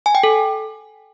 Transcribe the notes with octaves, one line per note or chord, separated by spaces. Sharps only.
G#5
G5
A4